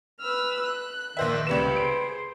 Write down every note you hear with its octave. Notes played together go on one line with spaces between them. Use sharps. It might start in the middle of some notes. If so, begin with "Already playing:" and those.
B4 E6 F6
F#6
A#1 D#3 C5 E5
C#2 G3 B4 E7
G#4 C5 D7